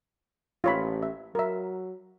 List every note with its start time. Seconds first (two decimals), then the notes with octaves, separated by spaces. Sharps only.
0.64 A1 F4 C#5 B5
1.03 E5
1.35 F#3 A#4 E5